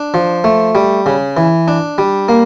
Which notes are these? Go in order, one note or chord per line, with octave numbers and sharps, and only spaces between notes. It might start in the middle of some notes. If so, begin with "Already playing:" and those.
Already playing: D4
F3
A3
G3
C#3
E3
D4
G3
A#3